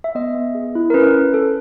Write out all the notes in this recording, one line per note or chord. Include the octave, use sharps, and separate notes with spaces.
E5
B3 D#5
B3
G#4
E4
A#4
C#4 B4
C#4
A4